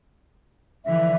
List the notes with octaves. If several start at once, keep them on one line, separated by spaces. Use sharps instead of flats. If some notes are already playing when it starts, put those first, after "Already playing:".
D3 E3 F3 E5